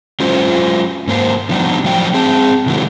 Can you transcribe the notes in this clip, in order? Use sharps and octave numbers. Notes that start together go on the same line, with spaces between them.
F#3 G#3 C#4 F4 C5
G#2 A#3 C5
D3 F3 G3 B3 D4 D#4
A2 F3 F#3 F#5 G5
C4 G#4 A5
C3 D#3 G#3 E4 F#4